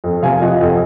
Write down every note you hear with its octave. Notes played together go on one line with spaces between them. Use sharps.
F2
C3 F5 G#5
F3 D#5 F#5
F2